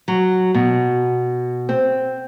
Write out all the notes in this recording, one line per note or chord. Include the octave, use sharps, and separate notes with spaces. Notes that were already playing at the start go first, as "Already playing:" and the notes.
F#3
B2
C4